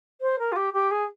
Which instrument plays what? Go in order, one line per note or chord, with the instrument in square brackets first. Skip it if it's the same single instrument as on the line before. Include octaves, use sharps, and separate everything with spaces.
[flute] C5
A#4
F4
G4
G4
G#4